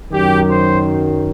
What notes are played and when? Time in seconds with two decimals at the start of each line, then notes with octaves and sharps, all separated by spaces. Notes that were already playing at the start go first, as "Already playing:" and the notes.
0.10 F#2 D#3 F#3 G4
0.49 C5